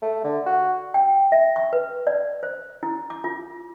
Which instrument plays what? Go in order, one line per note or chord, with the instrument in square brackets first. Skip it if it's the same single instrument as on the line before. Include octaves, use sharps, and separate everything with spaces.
[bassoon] A3
D3
F#4
[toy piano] G5
E5
C#6
B4
D5
C5
E4
D6
F4